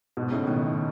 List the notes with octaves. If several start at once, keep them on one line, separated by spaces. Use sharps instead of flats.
G#2 B2
A2 C#3
B2 D#3